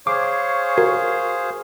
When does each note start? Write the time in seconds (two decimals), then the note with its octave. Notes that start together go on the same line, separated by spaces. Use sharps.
0.07 G#4 C5 C#5 F5 D6
0.78 F#4 A#4